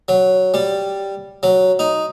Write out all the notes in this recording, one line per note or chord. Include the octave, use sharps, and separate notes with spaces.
F#3
G3
F#3
D#4